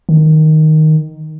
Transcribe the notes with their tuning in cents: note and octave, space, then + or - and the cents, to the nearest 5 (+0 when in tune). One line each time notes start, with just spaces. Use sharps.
D#3 +0